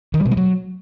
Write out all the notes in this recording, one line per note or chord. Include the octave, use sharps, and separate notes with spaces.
D#3
G3
B2
G#3
F#3